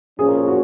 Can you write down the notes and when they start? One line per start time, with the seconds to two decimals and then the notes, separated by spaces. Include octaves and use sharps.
0.18 A#2 F3 A#3 C#4 G#4
0.28 A#4
0.37 G#4
0.48 F#4